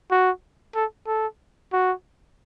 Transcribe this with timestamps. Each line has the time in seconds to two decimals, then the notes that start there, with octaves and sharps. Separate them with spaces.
0.11 F#4
0.75 A4
1.07 A4
1.73 F#4